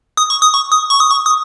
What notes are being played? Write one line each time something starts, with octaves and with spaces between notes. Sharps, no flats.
D#6
C#6
D#6
C#6
D#6
C#6
D#6
C#6
D#6